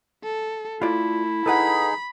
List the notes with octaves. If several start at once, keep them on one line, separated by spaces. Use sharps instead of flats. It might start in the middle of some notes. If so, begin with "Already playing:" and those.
A4
A3 E4 F4 D5
D#4 G#4 A4 B4 F#5 B5